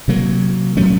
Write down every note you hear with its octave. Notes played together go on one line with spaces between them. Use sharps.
C3 F#3 A#3
A2 F#3 A3 C#4